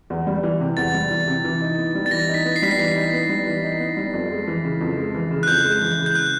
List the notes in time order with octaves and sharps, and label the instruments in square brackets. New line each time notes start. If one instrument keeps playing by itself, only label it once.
[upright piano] E2
G3
E3
C3
[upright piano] E2 [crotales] A6
[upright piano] G3
E3
C3
E3
D#4
B3
G3
[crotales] A6
[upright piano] E3 [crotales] A#6
[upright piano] D#4
[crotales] B6
[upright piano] B3
[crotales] C7
[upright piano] G3 [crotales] B6
[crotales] C7
[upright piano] E3 [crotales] B6
[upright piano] D#4
B3
G3
E3
D#4
B3
G3
F2
G#3
E3
C#3
F2
G#3
E3
C#3
[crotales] F#6
[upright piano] F2 [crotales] G6
[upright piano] G#3
E3
C#3
[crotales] G6
F#6